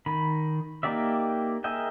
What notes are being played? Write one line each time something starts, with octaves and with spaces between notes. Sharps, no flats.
D#3 B5
A#3 D#4 G4 D5 E5
G#4 A#4 D#5 E5 G5